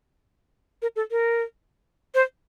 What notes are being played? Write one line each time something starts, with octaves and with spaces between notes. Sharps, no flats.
A#4
A4
A#4
C5